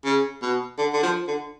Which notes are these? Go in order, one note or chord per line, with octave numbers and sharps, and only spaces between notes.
C#3
B2
D3
D3
F3
D3